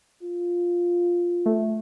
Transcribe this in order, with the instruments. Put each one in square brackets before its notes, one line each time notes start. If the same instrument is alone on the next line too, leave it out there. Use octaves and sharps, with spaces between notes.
[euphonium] F4
[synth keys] A3